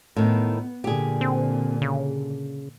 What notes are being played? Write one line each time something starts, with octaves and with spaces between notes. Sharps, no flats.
A2 D#3 B3
A#2 D3 G4 G#4
C4
C#3